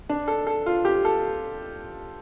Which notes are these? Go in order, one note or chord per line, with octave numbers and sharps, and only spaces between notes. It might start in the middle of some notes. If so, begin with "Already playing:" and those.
D4
A4
A4
F4
G4
A4